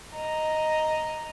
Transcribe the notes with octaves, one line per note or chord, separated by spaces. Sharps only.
D#5 A#5